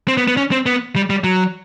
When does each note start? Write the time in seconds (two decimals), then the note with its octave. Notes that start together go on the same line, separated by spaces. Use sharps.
0.08 C4
0.17 B3
0.28 B3
0.37 C#4
0.52 C4
0.66 B3
0.96 G3
1.10 G3
1.24 F#3